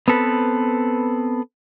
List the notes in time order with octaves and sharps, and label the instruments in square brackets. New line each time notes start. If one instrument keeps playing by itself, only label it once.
[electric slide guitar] B3 C4 A4 B4